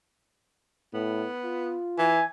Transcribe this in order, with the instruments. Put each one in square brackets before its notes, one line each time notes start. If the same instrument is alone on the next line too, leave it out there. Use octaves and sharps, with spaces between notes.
[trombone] A2 [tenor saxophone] B3
[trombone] F4
[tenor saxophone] E3 [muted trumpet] G#5